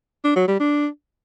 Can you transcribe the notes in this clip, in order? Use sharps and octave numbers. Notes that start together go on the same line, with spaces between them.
D4
F#3
G3
D4